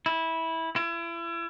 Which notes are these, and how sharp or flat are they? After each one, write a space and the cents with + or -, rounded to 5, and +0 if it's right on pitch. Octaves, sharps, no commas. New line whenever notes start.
E4 -15
E4 +35